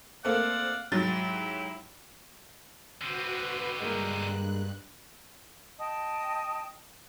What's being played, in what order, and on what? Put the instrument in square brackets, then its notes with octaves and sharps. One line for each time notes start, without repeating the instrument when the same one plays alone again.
[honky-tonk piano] A3 A#3 C4 [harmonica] D5 F5 F#5
[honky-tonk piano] G#2 F#3 A6 [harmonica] E4 G4
[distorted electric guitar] D3 C4 [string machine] F#4 B4
[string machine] G2 F#6 [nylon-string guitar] G#3 A#3 A#4
[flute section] D#5 G5 A5 D#6